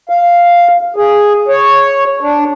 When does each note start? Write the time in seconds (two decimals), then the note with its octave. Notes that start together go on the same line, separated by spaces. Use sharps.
0.09 F5
0.96 G#4
1.48 C#5
2.21 D4